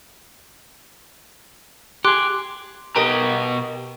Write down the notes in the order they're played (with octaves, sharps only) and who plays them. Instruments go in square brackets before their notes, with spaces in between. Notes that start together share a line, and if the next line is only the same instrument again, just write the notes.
[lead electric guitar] G4 G#4 [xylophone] C6 D6 F#6
[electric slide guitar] B2 B4 A#5 [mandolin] G4 A#4 D#5